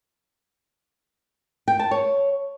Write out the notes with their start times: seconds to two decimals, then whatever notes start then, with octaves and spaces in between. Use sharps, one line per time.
1.68 G5
1.79 A5
1.91 C#5